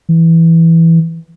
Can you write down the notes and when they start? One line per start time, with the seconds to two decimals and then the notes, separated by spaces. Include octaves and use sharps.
0.09 E3